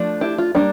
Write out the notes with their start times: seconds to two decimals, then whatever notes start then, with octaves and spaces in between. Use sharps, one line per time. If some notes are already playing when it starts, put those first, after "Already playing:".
Already playing: F3 A3 D4
0.21 E4 G4
0.38 F4
0.55 G3 A#3 D4